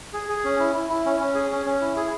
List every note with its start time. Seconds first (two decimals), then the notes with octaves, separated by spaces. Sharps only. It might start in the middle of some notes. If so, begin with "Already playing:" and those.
0.13 G#4
0.29 G#4
0.45 C#4
0.59 E4
0.74 E4
0.90 E4
1.06 C#4
1.20 C#4
1.35 G#4
1.51 C#4
1.65 C#4
1.81 E4
1.97 G#4